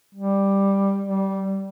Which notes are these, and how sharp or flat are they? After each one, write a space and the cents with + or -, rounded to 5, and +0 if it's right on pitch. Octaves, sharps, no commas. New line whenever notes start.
G3 +5
G3 -15